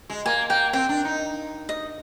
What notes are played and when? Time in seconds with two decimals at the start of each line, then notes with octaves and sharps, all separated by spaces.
0.10 G#3
0.26 A#3 G#5
0.50 A#3 G5
0.73 C4 G5
0.89 D4
1.05 D#4
1.69 D#5